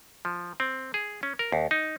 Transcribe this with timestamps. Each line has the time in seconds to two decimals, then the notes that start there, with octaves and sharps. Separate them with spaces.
0.25 F3
0.60 C4
0.94 G#4
1.23 C#4
1.39 A#4
1.52 D#2
1.71 D#4